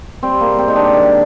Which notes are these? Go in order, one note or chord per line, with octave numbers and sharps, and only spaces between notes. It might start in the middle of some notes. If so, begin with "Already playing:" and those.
G3 C4
A#3
G#2
C4
D#3 D#4
D4
D#3